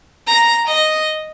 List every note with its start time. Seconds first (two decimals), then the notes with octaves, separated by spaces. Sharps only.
0.27 A#5
0.68 D#5